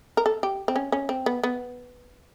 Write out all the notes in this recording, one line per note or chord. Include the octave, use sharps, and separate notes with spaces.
A#4
A4
G4
C4
C#4
C#4
C4
B3
B3